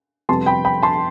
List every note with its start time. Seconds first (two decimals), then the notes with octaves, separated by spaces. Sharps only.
0.29 F2 C3 G3 B3 A5 C6
0.46 G5 B5
0.65 G5 B5
0.83 A5 C6